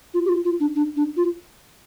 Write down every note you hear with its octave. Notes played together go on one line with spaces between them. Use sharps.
F4
G4
F4
F4
D4
D4
D4
F4